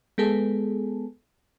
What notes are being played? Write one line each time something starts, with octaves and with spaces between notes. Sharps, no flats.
G#3 B3 G#4 A4